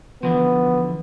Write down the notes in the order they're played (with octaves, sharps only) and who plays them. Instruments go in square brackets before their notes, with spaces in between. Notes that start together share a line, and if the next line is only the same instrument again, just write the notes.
[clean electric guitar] D3 E3 F3 [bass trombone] B3